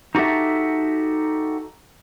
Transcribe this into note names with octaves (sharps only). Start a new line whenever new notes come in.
D#4 F#4 G4 A4 E5